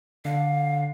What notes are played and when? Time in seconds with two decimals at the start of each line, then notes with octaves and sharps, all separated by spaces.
0.25 D3 F5